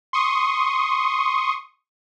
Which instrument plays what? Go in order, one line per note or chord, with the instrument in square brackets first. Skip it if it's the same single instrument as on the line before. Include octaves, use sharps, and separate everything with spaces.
[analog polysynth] C6 C#6 D#6